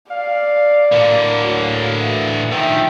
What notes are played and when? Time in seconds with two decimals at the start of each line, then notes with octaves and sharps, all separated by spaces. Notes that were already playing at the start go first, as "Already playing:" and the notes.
0.11 D5 F5
0.92 A2 D3 A#3
1.42 F#3
1.97 E3
2.52 D#3 F3 E5 G5